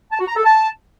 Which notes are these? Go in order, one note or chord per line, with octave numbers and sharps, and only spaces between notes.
A5
F#4
A#5
A4
A5